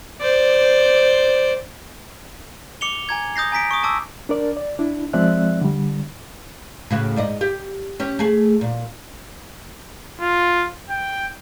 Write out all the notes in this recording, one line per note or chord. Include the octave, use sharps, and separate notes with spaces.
C5 D5
D6 C#7 F7 G7
G#5 A#5 G#6
D#6 G6 A#6 C7
G#5 A#5 B6 D7
C#6 D#6
A5 D6 E6
D4 A#4 D5
D5
D4 E4
F3 G#3 C4 D5 E5 F#6
D3 G3
A2 C#3 F#4
G#2 D5 D#5
G4
C#4 G4
A3 G#4
A#2
F4
G5